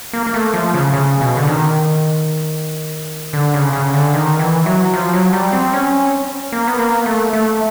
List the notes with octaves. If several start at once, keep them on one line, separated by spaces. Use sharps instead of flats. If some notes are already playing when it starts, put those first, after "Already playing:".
A#3
A#3
A3
F3
C#3
C#3
B2
D3
D#3
D3
C#3
C#3
D3
D#3
E3
F#3
F3
F#3
G3
C4
C#4
A#3
B3
A#3
A3
A3